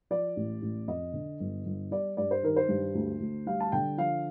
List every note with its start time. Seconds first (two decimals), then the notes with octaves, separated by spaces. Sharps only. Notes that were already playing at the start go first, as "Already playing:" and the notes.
0.10 F3 D5
0.36 A1
0.62 A1
0.88 F2 D#5
1.13 D3
1.40 G1
1.66 G1
1.91 G3 D5
2.17 G2 D5
2.31 C5
2.43 D#3 A#4
2.56 C5
2.68 G2
2.95 D2
3.20 D2
3.46 G3 F5
3.60 A5
3.72 D3 G5
3.98 F3 F5